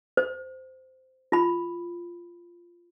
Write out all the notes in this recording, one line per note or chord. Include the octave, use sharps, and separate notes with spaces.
C5
F4 B5